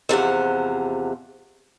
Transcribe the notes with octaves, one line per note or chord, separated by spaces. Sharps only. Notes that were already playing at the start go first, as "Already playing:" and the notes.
E2 C3 F3 F#5